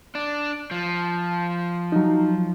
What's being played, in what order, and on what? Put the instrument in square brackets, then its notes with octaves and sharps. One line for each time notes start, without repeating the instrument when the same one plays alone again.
[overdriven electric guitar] D4
F3
[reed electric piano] F#3 D#4